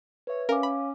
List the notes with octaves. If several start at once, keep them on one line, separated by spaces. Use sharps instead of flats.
B4 C#5 E5
C#4 A#4 F5 D6
B5